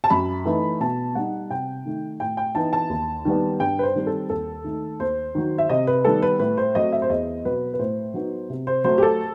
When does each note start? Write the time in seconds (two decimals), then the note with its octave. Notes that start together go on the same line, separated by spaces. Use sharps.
0.04 A5
0.10 F#2 B5
0.45 E3 A3 D#4
0.80 B2 A5
1.15 G3 D#4 F#5
1.50 C3 G5
1.85 D#3 A3 D#4
2.20 A2 G5
2.37 G5
2.55 E3 B3 D#4 A5
2.73 A5
2.89 D#2
3.25 D#3 G3 B3
3.60 G2 G5
3.79 B4
3.83 C5
3.95 D#3 G3 C4
4.07 A4
4.30 D#2 A4
4.64 D#3 A3 D#4
5.00 D#2 C5
5.35 D#3 F#3
5.58 E5
5.69 C3 D#5
5.87 B4
6.05 D#3 G3 B3 A4
6.22 B4
6.39 A2 B4
6.57 C5
6.75 F#3 A3 C4 D#5
6.92 E5
7.02 C5
7.09 E2 D#5
7.45 B2 F#3 B4
7.74 B4
7.79 A2 C5
8.14 F#3 B3 D#4
8.50 C3
8.67 C5
8.84 F#3 A3 C5
8.98 G4
9.03 A4